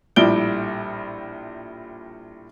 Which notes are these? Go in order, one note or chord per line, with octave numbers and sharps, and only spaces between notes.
A#1 A2 G3 D7 G7